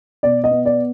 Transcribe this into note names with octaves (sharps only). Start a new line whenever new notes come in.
B2 D5
D#5
B3
D5